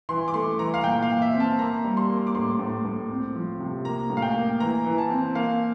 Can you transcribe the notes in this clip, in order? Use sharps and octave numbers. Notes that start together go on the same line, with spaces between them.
E3 C6
D6
A3 C6
E3 A#5
F5
A#2 G5
F5
A#2
E5
C4
A5
A#3 A#5
G3
C6
A#3
D6
A2 C6
A2
A2
C4
F3
C3
A#3 A#5
A2
F5
G5
A#3
E3 A#5
E3
A5
C4
A#3 F5